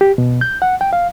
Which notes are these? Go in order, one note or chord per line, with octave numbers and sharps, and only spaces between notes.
G4
B2
G6
F#5
G5
F5